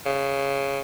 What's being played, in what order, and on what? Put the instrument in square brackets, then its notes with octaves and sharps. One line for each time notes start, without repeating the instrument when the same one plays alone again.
[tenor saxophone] C#3